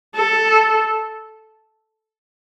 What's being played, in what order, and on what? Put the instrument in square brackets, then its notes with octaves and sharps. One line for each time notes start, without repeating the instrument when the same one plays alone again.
[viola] A4